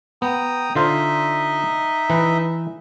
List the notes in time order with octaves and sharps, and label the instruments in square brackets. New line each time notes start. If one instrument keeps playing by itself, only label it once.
[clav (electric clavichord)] B3 [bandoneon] G5 A#5 D#6
[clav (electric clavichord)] D3 F4 C5 [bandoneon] D#4 D#5 E5
[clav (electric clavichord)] E3 B4